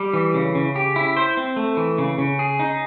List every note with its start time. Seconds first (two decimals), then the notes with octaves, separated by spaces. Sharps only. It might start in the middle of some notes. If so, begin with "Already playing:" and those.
Already playing: G3
0.13 E3
0.34 C#3
0.55 C#3
0.76 G4
0.96 E4
1.17 C5
1.37 C4
1.56 A3
1.77 E3
1.98 C#3
2.18 C#3
2.39 G#4
2.59 D#4